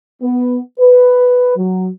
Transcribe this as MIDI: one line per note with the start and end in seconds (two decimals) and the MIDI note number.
0.22 0.59 59
0.79 1.54 71
1.56 1.88 54